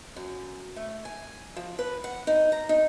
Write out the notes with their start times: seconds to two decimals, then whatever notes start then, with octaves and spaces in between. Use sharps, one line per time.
0.16 F#2
0.76 A3
1.05 G#5
1.57 F3
1.79 B4
2.04 F#5
2.27 D#4
2.52 A#5
2.69 D#4